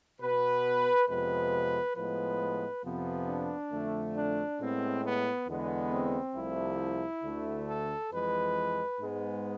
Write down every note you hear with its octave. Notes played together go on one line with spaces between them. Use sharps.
B2 B3 B4
F2 C3 G#3 B3 B4
A2 F3 G#3 B3 B4
F2 C3 F3 B3
D4
F2 D3 A3
D4
A2 G#3 B3 C4
B3
E2 D3 G#3 B3
C4
C2 C3 F3 A3 E4
D2 D3 A3
A4
F2 E3 G#3 B4
G#2 G#3 B3